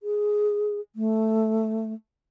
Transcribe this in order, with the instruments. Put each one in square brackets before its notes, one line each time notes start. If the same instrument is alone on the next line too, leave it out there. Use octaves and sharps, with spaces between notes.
[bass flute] G#4
A3